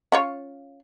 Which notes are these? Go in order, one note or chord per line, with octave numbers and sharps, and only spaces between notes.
C#4 F4 C#5